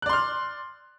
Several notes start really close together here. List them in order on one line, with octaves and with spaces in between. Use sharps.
F#6 D5 C6 F6